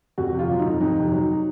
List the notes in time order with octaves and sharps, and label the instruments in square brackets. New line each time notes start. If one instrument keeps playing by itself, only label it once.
[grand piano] F2 F#4
C3
F4
F#3
D#4
F2
F2 D#4
C3
F#3